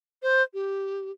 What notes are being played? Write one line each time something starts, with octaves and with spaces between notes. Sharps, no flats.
C5
G4